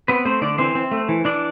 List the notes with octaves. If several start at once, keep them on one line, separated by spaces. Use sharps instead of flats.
B3 C4 B4
A3 C4 C5
D3 D4 D5
E3 C4 C5
C4
A3
E3
E3 D4 D5